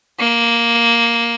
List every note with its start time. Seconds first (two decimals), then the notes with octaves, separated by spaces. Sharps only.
0.19 A#3